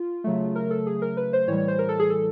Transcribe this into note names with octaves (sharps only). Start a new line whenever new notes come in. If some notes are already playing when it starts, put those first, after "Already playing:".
Already playing: F4
C#3 F#3 A3
A#4
A4
G#4
A#4
B4
C5
A2 E3 G3 C#5
C#5
C5
A#4
A4
G#4
A4